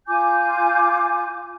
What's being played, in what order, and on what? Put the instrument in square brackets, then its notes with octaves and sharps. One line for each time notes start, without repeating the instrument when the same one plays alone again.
[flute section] F4 G#5 D6 G6